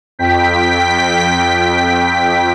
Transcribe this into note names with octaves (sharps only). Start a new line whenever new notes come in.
F2 G5 B6